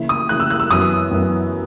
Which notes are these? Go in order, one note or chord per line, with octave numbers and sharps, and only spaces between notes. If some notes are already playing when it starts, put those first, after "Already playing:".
Already playing: C#3 E3 A#3 E4
D#6
C#3 E3 A#3 E4 F#6
E6
F#6
E6
F#2 E3 B3 D#6
F#2 E3 B3